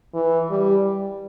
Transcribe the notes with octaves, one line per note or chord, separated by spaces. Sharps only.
E3
G3